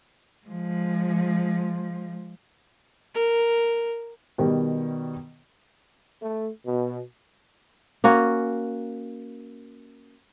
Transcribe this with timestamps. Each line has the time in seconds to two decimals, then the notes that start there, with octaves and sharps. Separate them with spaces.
0.46 F3 G#3
3.15 A#4
4.38 B2 D#3 G3
6.21 A3
6.66 B2
8.04 A#3 C#4 F#4